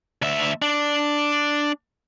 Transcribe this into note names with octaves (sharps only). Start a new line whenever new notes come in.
D2 E5
D4